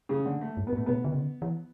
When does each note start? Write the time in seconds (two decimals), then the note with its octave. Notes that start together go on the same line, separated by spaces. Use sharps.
0.09 C#3
0.25 D3
0.41 A3
0.57 G2
0.67 B3
0.73 A2
0.77 A3
0.86 B2 B3
1.04 D3
1.12 C#3
1.21 D3
1.42 E3